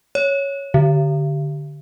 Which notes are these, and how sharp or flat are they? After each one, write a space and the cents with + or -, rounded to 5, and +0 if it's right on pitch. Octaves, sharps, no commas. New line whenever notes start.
C#5 +5
D3 +0